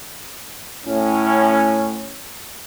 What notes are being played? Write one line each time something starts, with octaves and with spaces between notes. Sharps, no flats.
A2 C#4